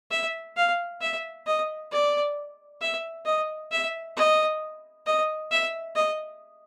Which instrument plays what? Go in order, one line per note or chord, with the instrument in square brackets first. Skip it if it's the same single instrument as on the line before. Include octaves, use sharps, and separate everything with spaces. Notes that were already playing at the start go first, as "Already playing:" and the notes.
[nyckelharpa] E5
F5
E5
D#5
D5
E5
D#5
E5
D#5
D#5
E5
D#5